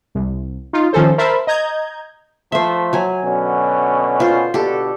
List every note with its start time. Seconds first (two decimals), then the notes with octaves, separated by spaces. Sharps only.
0.15 C2
0.73 D#4 F4
0.93 D#3 F3 C#4 A4 C5
1.18 A#4 C5 E5 A5 B5 C6
1.47 D#5 A#5 G6 G#6
2.52 F3 A3 C5 E5
2.93 F#3 G#5
3.23 B2 D3 C#4
4.20 F4 C5
4.54 B2 D3 D4 G4 A4